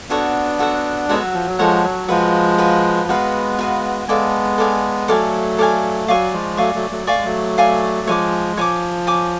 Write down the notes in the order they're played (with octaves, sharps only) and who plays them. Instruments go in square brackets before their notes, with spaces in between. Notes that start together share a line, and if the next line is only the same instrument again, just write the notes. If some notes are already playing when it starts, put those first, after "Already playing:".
[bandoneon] B3 D4 [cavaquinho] F#4 A4 C#5 F#5
[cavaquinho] F#4 A4 C#5 F#5
[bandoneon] G#3 B3 [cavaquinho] F#4 A4 C#5 F#5
[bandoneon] F#3
F3
F#3
[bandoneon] F3 G#3 [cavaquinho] F#4 A4 C#5 F#5
[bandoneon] F#3
[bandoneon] F3 G#3 [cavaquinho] F#4 B4 F5
[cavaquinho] F#4 B4 F5
[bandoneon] G#3 B3 [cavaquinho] F#4 B4 F5
[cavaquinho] F#4 B4 F5
[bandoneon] G#3 B3 [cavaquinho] A4 D5 F5 G#5
[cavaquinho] A4 D5 F5 G#5
[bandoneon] F#3 A3 [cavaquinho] A4 D5 F5 G#5
[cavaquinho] A4 D5 F5 G#5
[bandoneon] F#3 [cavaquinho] D5 F5 G#5 C#6
[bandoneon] F3 G#3
[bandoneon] F#3 A3 [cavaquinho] D5 F5 G#5 C#6
[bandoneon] F#3 A3
F#3 A3
[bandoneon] A3 [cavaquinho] D5 F5 G#5 C#6
[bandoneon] G#3
F#3 A3
[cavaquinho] D5 F5 G#5 C#6
[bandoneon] F3 G#3 [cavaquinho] C#5 G#5 D6
[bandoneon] F3 [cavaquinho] C#5 G#5 D6
[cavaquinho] C#5 G#5 D6